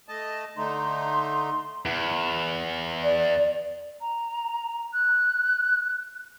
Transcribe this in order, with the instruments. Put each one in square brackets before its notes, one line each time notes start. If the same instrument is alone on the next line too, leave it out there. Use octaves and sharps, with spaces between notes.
[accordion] A3 D#5 A5
[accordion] D3 A3 D#4 [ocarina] C6
[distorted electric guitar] E2
[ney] D5
[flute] A#5
F#6